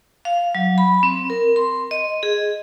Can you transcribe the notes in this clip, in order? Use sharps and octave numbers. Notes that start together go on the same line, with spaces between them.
F5
F#3
B5
C4
A#4
C6
D#5
G#4